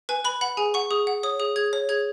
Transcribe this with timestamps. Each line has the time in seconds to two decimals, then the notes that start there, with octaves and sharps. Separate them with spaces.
0.09 B4 G#5
0.24 B4 B5
0.41 F#5 B5
0.57 G#4 G#5
0.74 F#5 C#6
0.91 G#4 D#6
1.07 F#5
1.23 C#5 D#6
1.40 G#4 D#6
1.56 G#4 G#6
1.73 C#5
1.89 G#4 G#6